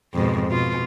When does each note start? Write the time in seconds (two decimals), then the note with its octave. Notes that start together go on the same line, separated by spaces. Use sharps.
0.14 F2 G#2 B2
0.48 B2 F4